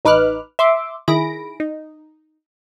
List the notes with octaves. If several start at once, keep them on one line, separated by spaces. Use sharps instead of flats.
A1 D#4 B4 D6 F6 F#6
E5 C6 D6
D#3 E4 G#4 B5 A#6 D7
D#4